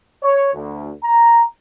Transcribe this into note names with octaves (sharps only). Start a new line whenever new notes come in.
C#5
D2
A#5